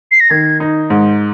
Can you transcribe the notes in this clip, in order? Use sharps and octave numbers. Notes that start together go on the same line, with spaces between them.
C7
A#6
D#3 G#6
D#4
G#2